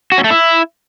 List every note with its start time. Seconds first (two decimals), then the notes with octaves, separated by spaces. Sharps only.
0.12 F#4
0.18 C#4
0.24 A3
0.30 E4